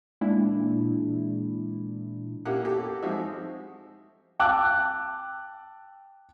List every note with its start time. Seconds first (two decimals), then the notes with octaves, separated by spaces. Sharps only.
0.21 A#2 E3 G#3 D4 E4
2.45 A#3 C#4 E4 G4 F#5
2.64 E4 F#4 G4 A4
3.02 F3 G#3 C4 D#4 F#4 E5
4.39 G5 A5 D6 E6 F#6